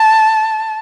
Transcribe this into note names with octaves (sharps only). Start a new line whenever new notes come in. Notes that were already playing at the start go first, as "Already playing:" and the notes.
Already playing: A5